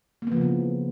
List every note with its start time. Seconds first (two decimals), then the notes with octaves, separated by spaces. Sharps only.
0.22 A#3
0.27 B3
0.32 F3
0.37 C#3
0.41 E3